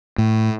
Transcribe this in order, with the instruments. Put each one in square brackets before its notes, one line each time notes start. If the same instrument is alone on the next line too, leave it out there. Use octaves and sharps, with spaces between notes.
[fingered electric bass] A2